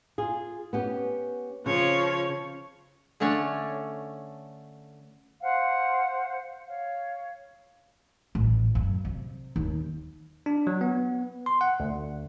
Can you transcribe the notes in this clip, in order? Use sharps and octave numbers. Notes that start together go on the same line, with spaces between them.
F4 G#4
B3 C#4 G4
C#3 F3 C#5
D3 A3 C#4 D4 C#5
C5 F5 F#5
C#5 F5
A1
F#2
C3
D#2
D4
F#3
B3
C6
F#5
D2